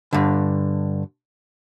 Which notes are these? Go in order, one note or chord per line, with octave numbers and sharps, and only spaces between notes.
G2 D3